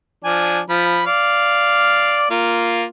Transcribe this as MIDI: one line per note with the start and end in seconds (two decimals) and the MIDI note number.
0.25 0.60 53
0.25 0.60 62
0.25 0.60 80
0.69 1.03 53
0.69 1.03 83
1.06 2.30 74
1.06 2.30 77
2.31 2.84 58
2.31 2.84 65